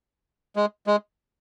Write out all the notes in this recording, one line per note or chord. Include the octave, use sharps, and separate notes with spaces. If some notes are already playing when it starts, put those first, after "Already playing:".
G#3
G#3